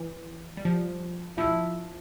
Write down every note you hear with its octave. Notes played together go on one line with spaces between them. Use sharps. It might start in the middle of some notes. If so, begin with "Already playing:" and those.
Already playing: E3
G3
F3
F3 E4